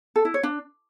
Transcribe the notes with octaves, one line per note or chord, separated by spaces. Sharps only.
A4
E4
C#5
D4